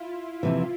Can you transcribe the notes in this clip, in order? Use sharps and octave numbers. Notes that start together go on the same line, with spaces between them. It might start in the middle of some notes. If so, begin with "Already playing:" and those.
Already playing: E4 F4
F2 C3 E3